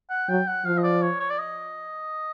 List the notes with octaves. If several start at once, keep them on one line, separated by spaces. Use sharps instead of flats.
F#5
F#3 G5
F#5
F3 F5
D#5
D5
C#5
C#5
D5
D#5